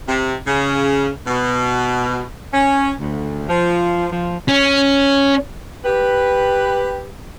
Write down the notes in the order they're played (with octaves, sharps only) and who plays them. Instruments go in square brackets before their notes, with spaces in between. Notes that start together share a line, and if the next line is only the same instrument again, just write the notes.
[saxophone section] C3
C#3
B2
C#4
D2
F3
F3
[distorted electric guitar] C#4
[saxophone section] G4 B4